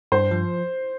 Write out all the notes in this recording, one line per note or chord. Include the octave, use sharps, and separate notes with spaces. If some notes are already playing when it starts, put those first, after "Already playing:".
G2 C5
F3